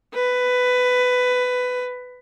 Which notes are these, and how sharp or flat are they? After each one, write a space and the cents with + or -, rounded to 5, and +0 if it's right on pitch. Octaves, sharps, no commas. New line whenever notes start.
B4 +15